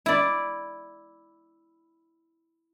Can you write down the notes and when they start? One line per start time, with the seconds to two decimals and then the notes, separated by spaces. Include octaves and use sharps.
0.06 E4 D5